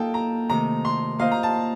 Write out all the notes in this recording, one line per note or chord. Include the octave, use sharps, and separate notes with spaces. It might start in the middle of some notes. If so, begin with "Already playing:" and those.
Already playing: A#3 D#4 F4 A4 G5 A5
A#5
C3 D#3 A3 A#5
C6
A#3 F4 C5 D#5 F5
A#5
A5